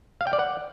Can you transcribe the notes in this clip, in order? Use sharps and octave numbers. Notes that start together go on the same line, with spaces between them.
F5
G5
D5
F#5